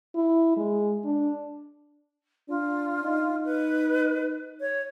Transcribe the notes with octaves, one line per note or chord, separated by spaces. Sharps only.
E4
G#3
D4
D4 F4
D#4
B4
C#5